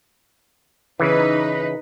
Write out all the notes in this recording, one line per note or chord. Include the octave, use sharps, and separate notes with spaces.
C#3 E3 D#4 B4